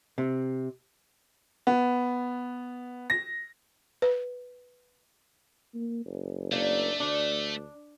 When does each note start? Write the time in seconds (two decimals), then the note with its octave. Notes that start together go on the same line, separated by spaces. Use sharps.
0.18 C3
1.67 B3
3.10 A#6
4.02 B4
5.75 A#3
6.06 F#1
6.52 A3 A#3 D4
7.00 D2 D4